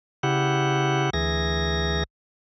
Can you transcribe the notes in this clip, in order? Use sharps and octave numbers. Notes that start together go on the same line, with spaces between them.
C#3 E4 G4 F#5
D2 E3 G#4 A#6